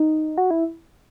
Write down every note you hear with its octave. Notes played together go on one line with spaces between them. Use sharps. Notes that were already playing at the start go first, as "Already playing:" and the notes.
Already playing: D#4
F#4
E4